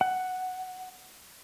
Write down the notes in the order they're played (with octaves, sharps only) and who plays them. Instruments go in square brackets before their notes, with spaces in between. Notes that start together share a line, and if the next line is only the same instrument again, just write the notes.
[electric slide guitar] F#5